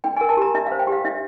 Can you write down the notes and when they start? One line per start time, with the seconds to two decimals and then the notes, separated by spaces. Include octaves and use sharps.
0.04 D4 G5
0.17 G#5
0.21 A#4
0.29 A5
0.37 G4 A#5
0.54 D4 E5
0.67 F5
0.72 C5
0.79 G5
0.87 G4
0.92 F5
1.05 D4 E5